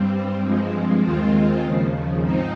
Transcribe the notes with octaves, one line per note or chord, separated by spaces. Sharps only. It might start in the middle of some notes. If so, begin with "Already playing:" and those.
Already playing: G2 G3 C4
G2 F3 G#3 C4
D#2 D#3 G#3 C4 F4
D#2 C#3 F3
G#2 F3 C4 D#4